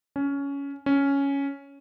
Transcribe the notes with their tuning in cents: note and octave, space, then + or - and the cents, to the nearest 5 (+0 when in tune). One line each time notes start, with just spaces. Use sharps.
C#4 +15
C#4 +5